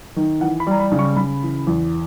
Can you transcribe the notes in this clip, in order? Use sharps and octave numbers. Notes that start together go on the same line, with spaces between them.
D#3
E3 F#5
B5
G3 A#5
B5
C#3
C#6
C#3 B5
E3
E2